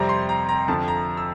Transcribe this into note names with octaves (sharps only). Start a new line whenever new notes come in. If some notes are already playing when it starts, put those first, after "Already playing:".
Already playing: F2 C3 G3 C4 A#5
C6
A#5
A#5
F2 D3 F3 A5
A#5
E6